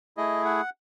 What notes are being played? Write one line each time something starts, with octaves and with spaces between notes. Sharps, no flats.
A3 E4 G#4 D#5
F#5